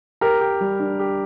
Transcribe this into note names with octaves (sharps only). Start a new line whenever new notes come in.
G4 A#4
G4
G3
D4
G4